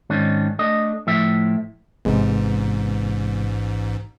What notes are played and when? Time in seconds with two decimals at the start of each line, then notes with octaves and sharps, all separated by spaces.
0.10 G#2 D#3 C#4 D4
0.59 A3 D4 D#5
1.07 A2 F3 E5
2.05 A1 G#2 C3 G#3 B3